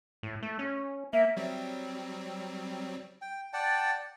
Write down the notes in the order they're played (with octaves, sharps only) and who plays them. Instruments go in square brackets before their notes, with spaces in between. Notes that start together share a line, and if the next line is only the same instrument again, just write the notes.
[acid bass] A2
A3
C#4
[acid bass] A#3 [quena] E5
[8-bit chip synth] F#3 G3 C4
[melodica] G5
D5 F#5 G5 A5